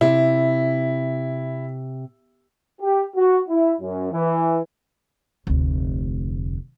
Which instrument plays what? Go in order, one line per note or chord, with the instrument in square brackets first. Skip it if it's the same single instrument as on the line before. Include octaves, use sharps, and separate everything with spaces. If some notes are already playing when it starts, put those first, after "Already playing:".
[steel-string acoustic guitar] C3 [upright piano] E4
[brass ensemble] G4
F#4
E4
F#2
E3
[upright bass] F1 D2